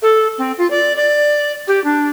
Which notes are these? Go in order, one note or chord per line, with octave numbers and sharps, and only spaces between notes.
A4
C4
F4
D5
D5
G4
D4